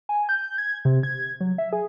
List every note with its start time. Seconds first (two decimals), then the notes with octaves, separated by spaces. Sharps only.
0.09 G#5
0.29 G6
0.58 G#6
0.85 C3
1.03 G#6
1.41 F#3
1.58 E5
1.73 G#4